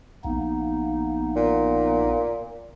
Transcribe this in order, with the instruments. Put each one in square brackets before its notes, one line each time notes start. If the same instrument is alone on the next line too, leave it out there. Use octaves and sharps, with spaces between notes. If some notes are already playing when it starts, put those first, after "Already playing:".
[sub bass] A#1 [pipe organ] A#3 B3 D#4
[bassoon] A#2